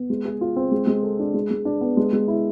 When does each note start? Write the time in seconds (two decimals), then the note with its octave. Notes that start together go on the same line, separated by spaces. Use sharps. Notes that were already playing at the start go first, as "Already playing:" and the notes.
Already playing: B3
0.10 G#3
0.25 G#4
0.41 F4
0.56 C4
0.71 G#3
0.87 G#3
1.03 A4
1.20 D4
1.34 G#3
1.51 G#3
1.65 D4
1.81 B3
1.97 G#3
2.13 G#3
2.28 E4